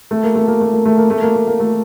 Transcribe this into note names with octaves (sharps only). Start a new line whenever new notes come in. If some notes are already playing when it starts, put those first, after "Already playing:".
A3
A#3
A3
A#3
A3
A#3
A3
A#3
A3
A#3
A3
A#3
A3